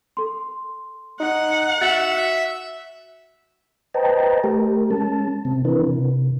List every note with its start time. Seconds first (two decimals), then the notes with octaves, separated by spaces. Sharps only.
0.17 A4 C6
1.20 D#4 F#5
1.81 F#4 E5 A6 C#7 F#7
3.94 B4 C5 D#5 G5 A5 A#5
4.44 A3 G4 A#4
4.91 G#3 C#4 A5
5.45 C3 C4
5.65 E3 C4 D4 E4 A#4 B4
5.87 C3